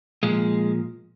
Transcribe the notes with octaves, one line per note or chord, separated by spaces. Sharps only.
A#2 F3 G#3